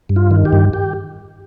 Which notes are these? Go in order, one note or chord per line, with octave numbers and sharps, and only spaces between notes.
G2
F4
D#3
G4
G2
G4